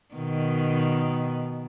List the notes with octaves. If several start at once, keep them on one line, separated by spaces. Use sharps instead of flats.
B2 D#3